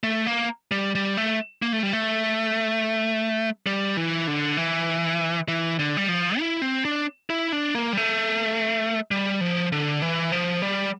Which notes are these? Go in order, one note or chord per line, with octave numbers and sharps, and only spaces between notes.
A3
A#3
G3
G3
A3
A#3
A3
G3
A3
G3
E3
D3
E3
E3
D3
G3
F3
E4
C4
D4
E4
D4
A#3
G3
A3
G3
F3
D3
E3
F3
G3